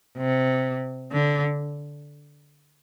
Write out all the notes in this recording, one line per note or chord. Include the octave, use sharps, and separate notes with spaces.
C3
D3